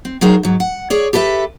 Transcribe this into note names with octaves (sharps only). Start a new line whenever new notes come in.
C4
F#3 D#4 G#4 A#4 C5
G#2 F#3
F#5
G#4 C#5 D5
G4 A4 B4 D5 E5